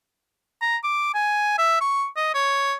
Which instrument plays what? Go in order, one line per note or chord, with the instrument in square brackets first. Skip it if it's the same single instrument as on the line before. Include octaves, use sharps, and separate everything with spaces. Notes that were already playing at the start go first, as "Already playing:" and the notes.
[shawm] A#5
D6
G#5
E5
C#6
D#5
C#5